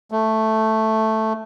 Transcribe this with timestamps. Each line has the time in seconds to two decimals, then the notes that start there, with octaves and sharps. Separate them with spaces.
0.11 A3